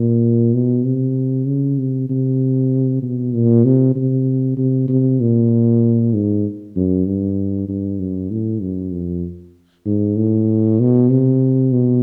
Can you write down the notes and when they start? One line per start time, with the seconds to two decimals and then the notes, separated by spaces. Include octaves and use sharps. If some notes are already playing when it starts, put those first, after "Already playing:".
Already playing: A#2
0.54 B2
0.85 C3
1.47 C#3
1.79 C3
2.10 C3
3.02 B2
3.34 A#2
3.65 C3
3.96 C3
4.57 C3
4.89 C3
5.21 A#2
6.14 G#2
6.76 F#2
7.06 G2
7.69 G2
8.00 F#2
8.31 A2
8.62 F#2
8.92 F2
9.86 G#2
10.17 A2
10.80 B2
11.10 C3
11.73 B2